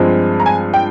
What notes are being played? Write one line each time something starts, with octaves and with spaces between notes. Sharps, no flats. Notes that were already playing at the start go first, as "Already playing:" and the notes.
Already playing: G2 F3 G#3 C4
A#5
G#5
G5